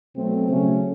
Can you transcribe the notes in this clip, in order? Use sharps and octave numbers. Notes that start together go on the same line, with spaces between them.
B2 F#3 A3 C4
C#3 F#3 A3 C#4